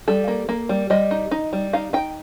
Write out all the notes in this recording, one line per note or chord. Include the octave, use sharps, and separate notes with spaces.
G3 A4
A#3
A#3
G3
G3 D#5
D#4
D#4
G3
D#4 F5
D#4 G5